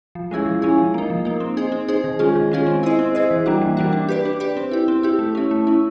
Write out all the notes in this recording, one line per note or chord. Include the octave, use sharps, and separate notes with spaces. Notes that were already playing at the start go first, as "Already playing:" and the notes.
F3
G#3 C#4 E4 G#4
F3
G#3 C#4 E4 G#4
F3
A#3 D#4
F3
A#3 D#4
C4
D#4 G#4 C5
C4
D#4 G#4 C5
D#3
G#3 C#4 F4 G#4
D#3
G#3 C#4 F4 G#4
C4
E4 G#4 C5 D#5
C4
E4 G#4 C5 D#5
E3
G3 A#3 D4 F#4
E3
G3 A#3 D4 F#4
D4
G4 B4 D5
D4
G4 B4 D5
C4
E4 G4
C4
E4 G4
A3
C#4 E4
A3
C#4 E4